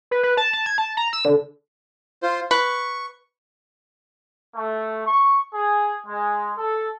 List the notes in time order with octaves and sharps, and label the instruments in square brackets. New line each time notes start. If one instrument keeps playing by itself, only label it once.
[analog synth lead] B4
B4
A5
A5
G#6
A5
A#5
E6
D3
[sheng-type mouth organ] F4 C5
[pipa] B4 [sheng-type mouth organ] C#6
[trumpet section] A3
C#6
G#4
G#3
A4